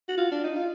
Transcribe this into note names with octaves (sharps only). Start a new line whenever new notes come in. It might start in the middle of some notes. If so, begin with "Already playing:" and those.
F#4
F4
D4
D#4
F4